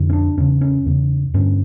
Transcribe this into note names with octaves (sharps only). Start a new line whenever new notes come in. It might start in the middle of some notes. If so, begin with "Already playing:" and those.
Already playing: F2 D3
C#4
D4
E2 C#3 C#4
C#4
E2 C#3
G2 D3 C#4